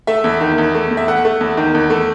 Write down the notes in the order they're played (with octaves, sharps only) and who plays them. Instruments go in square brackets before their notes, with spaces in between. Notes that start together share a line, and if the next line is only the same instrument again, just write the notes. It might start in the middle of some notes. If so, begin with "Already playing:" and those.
[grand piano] A3 E5
E2
D#3
E2
A3
E2
E5
A3 F#5
A3
E2
D#3
E2
A3